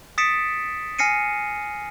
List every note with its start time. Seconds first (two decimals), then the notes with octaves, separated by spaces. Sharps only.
0.18 D#6 A6 B6 C#7 D7 E7
0.99 G#5 F6 A#6 C7 C#7 D#7